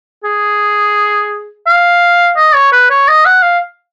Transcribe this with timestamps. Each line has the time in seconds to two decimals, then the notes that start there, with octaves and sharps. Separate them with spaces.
0.24 G#4
1.67 F5
2.36 D#5
2.54 C#5
2.72 B4
2.90 C#5
3.08 D#5
3.25 F#5
3.42 F5